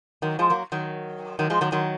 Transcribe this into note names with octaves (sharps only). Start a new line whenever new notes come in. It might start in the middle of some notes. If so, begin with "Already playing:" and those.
D#3 F#3
F3 G#3
F#3 A#3
D#3 F#3
D#3 F#3
F3 G#3
D#3 F#3
D#3 F#3